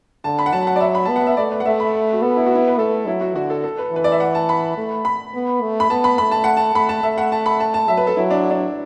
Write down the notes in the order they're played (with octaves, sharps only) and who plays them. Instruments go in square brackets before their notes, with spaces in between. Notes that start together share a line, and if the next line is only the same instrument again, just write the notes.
[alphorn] D3 [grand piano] A5
[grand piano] B5
F#5
[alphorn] F#3 [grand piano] A5
[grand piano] F#5
D5
E5
B5
[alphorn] B3 [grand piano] A5
[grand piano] F#5
E5
[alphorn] A3 [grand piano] D5
[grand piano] B4
F#5
[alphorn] A3 [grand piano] E5
[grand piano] B5
F#4
[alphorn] B3 [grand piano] A4
[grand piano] E4
F#4
E4
B4
[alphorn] A3 [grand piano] A4
[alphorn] F#3 [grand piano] E4
[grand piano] F#4
[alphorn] D3 [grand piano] F#4
[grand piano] A4
A4
B4
[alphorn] E3 [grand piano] B4
[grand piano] D5
E5
F#5
A5
B5
[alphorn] A3
[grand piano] B5
[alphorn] B3
A3
[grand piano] B5
[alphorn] B3 [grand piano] A5
[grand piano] B5
[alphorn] A3 [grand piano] B5
[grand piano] A5
F#5
A5
[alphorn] A3 [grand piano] B5
[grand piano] A5
[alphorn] A3 [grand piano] E5
[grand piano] F#5
A5
B5
A5
A5
[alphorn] F#3 [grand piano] E5
[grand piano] B4
A4
[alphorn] F#3 [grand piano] E4
[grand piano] D4
D4